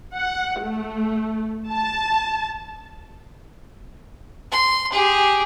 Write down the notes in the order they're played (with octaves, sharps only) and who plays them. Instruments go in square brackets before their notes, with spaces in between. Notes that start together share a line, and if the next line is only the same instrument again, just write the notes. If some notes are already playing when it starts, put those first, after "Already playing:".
[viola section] F#5
A3
A5
[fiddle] C6
G4 G#4